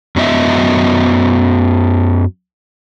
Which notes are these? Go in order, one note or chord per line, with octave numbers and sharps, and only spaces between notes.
F#2 F#3 B3 D#5 E5